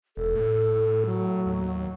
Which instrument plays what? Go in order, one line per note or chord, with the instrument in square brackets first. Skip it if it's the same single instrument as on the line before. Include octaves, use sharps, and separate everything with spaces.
[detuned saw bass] E1 [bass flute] A4
[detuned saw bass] A2
[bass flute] F#3
[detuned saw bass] D#2